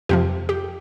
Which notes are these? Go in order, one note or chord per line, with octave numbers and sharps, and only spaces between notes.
F2 C3 F3 G4
G4